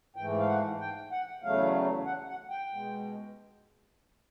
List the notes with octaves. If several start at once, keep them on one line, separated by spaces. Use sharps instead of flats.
G#2 E3 A3 G5
F5
F#5
G5
F#5
E2 C#3 F#3 A3 F5
F#5
F#5
G5
B2 G#3